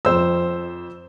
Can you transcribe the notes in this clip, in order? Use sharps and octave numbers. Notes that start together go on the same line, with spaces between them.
F2 C5 E6